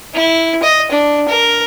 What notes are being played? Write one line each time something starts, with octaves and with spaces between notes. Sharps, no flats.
E4
D#5
D4
A#4